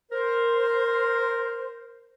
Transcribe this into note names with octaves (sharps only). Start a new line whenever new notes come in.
A#4 C5